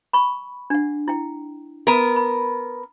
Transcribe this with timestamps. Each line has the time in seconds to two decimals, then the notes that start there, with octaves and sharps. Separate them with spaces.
0.13 B5 C#6
0.70 D4 F#5
1.08 E4 G5
1.87 B3 A#4
2.16 B5